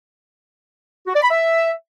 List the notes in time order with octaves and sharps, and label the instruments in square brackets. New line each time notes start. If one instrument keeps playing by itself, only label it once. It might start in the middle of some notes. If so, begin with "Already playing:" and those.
[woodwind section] F#4
D5
B5
E5